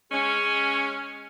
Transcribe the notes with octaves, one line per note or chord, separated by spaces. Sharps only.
G#3 C#4